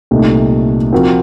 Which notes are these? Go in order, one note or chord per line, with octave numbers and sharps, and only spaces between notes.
C2 A#2 A3 D#4
F3 C4 F#4 A#4